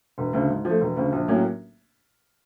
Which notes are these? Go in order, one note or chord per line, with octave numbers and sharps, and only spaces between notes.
E1
D2 C#3
G#2
F3 A3
E1
D2 C#3
A#1
A2 F#3 A#3 C#4